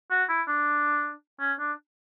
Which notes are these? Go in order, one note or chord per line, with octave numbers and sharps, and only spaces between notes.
F#4
E4
D4
C#4
D4